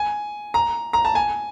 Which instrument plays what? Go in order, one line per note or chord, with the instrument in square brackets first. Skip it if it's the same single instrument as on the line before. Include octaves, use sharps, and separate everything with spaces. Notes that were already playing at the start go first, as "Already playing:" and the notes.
Already playing: [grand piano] G#5
A#5
A#5
A5
G#5